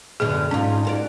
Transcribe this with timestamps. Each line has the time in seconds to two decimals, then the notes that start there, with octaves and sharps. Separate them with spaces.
0.20 F#2 B2 D3 G#4
0.51 G#2 C#4 F4
0.85 F#4 A4 D5